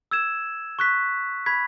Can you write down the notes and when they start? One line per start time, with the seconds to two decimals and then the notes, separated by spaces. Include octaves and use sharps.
0.11 E6 G#6 E7
0.79 C#6 F#6 B6
1.46 B5 G#6 B6